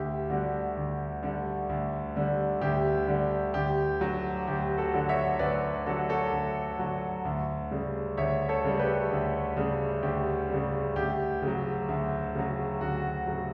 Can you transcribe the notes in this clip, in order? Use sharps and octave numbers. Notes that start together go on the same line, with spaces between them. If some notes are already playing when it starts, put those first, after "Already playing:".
Already playing: D2 G4
D3 G3 F#4
D2
D3 G3
D2
D3 G3
D2 G4
D3 G3
D2 G4
D3 F#3
D2 G4
F#4 A4
D3 F#3
C#5 E5
D2 B4 D5
D3 F#3 F#4 A4
A4 C#5
D2
D3 F#3
D2
C#3 G3
D2 C#5 E5
A4 C#5
C#3 G3
G4 B4
D2
C#3 G3
D2 G4
C#3 G3
D2 G4
C#3
F#3
D2
C#3 F#3
D2 F#4
C#3 F#3